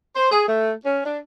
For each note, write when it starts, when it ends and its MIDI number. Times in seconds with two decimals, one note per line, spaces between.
0.15 0.31 72
0.31 0.45 68
0.48 0.72 57
0.85 1.00 61
1.05 1.17 62